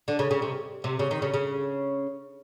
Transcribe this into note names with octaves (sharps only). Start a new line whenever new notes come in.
D3
C#3
C#3
C3
C3
C#3
D#3
C#3
C#3